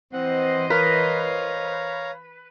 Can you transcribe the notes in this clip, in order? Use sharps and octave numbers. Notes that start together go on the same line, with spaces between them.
E3 C4 C5 D#5 F#5
A#4 B4 C#5 F5 A#5